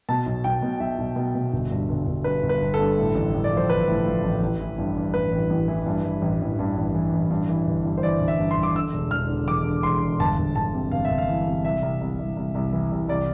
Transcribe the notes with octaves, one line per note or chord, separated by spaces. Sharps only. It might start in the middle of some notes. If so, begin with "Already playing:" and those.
B2 A5
B1
B1 G5
B2
B1 E5
B1
B2
B2
G1
G2
G1
G1
G2 B4
G1
B4
G1
G2 A4
A2
A1
A1
D5
F3
C5
A1 B4
A2
F3
A1
A1
E3
G2
G2
A1 B4
A1
A1
E3
G2
E3
A1
A1
G2
A1
E3
A1
G2
E3
G1
G2
C5
E3 D5
G1
E5
G2
C6
G1
D6
D3 E6
E1
E1 F6
D3
E1 D6
D3
E1 C6
E1
G1 A5
G1
G1 A5
C3
G1 F5
E5
G1
F5
E3
C3
C2 E5
C2
C2
C2
C2
C2
E3
C2
C2 D5